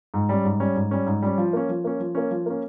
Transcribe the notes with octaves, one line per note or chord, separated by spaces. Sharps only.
G#2
G3 C#4
G#2
G3 C#4
G#2
G3 C#4
G#2
G3 C#4
F3
A#3 C#4
F3
A#3 C#4
F3
A#3 C#4
F3
A#3 C#4